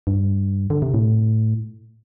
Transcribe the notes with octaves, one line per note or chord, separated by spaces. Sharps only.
G2
D3
C3
A2